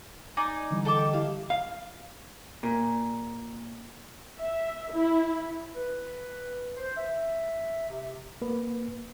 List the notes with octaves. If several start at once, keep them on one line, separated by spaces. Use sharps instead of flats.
D#4 D5 G#5
D3 E3 G3
D3 A4 D#5 G5 D6 E7
E4 G4 F5
F5
A#2
E5
E4
B4
C5
E5
C3
A#3 B4